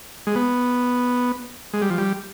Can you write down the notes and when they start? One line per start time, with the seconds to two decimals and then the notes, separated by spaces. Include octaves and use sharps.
0.27 G#3
0.35 B3
1.73 G#3
1.82 G3
1.90 F3
1.98 G3